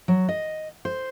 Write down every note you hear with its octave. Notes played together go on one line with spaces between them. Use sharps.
F#3
D#5
C5